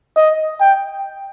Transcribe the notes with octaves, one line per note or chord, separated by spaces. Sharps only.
D#5
G5